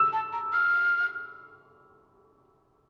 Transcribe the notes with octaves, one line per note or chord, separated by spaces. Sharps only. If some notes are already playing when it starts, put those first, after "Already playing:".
Already playing: E6
A5
A#5
F6